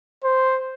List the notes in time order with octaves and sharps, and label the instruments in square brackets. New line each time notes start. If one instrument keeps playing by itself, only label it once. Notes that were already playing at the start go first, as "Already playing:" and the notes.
[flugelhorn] C5